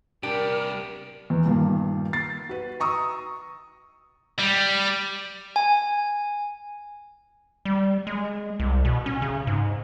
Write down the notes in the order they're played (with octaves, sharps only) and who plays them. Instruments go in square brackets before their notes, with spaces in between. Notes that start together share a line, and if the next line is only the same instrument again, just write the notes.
[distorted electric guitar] C2 B3 [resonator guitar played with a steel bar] D4 [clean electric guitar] G4 [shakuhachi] A#4
[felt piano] E2
G2 A#2 D#3 A#3
A6 C7
F#4 B4
A#5 C#6 D#6 E6
[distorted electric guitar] G3
[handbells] G#5
[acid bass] G3
G#3
C2
B2
C#4
C#3
G#2